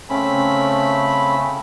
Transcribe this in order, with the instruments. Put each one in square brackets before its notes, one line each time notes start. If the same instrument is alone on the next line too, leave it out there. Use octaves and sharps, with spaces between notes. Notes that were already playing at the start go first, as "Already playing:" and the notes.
[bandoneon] C#3 A3 C4 C#4 B5